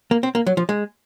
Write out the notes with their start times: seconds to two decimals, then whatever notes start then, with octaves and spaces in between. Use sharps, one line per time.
0.11 A#3
0.23 C4
0.35 A#3
0.46 F#3
0.57 F3
0.69 G#3